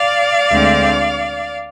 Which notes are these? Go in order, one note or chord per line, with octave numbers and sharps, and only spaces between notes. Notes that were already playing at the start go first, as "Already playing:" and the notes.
Already playing: D5 F5
D2 D3 G#3 C4